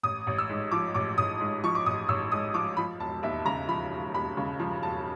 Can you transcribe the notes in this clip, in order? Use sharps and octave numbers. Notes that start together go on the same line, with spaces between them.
A1 D#6
A1
E6
G#2
F3 D6
A1 D6
A1 D#6
G#2
F3 C#6
D6
A1 D#6
A1 E6
G#2 D#6
F3 D6
F3 B5
E1 A5
D#2 E5
C#3 A#5
F3 B5
E1
D#2 B5
C#3
F3
E1 A5